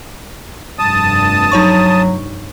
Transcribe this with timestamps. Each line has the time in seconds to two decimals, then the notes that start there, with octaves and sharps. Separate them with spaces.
0.79 F1 G2 A5 D#6
1.52 F#3 D#4 C#5 C#6